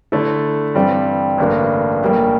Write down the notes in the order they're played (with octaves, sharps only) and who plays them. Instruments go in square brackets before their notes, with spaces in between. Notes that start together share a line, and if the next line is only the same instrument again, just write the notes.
[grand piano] D3 A3 E4 A4
G2 E3 G3 C4
A1 G2 D3 G3 A#3
A#1 A2 G3 A#3